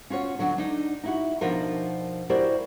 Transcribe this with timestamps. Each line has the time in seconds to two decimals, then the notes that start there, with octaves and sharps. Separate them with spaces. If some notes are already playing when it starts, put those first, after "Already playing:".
0.10 C#4 F4 F#4 C#5
0.39 D3 F#3 D4
0.58 D4 D#4
1.03 D#4 E4 F#4
1.41 B2 F3 D4 D#4 F#4 A#4
2.29 E4 F#4 G4 A#4 C5 D5